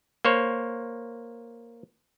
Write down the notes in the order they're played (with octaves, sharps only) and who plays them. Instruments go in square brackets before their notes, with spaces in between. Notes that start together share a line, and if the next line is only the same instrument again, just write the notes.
[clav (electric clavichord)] A#3 C5 C#5